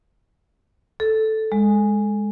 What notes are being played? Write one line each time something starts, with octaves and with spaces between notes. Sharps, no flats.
A4
G#3